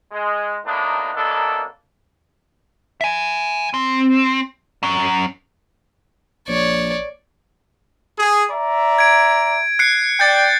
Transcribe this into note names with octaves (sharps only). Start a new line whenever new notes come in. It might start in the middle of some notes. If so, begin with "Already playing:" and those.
G#3
D#2 A2 A#3 B3 D4 D#4
F#2 D#3 A#3 B3 D4 A4
E5 G#5
C4
F#3 C#4
A#1 C#5 D5
G#4
D5 E5 A#5
G#6 D7
F#6 C7 C#7
D5 G5 G6 A6